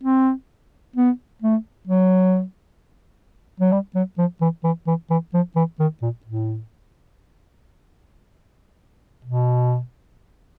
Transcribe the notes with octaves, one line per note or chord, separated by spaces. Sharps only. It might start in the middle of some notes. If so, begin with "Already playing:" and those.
C4
B3
A3
F#3
F#3
G3
F#3
F3
E3
E3
E3
E3
F3
E3
D#3
A#2
A2
B2